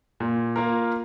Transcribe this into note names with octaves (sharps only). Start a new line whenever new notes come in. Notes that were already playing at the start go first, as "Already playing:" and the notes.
A#2
A#3 F4 A#4